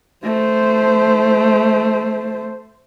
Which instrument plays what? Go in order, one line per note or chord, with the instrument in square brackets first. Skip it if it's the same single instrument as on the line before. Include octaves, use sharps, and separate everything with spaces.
[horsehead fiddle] A3 C5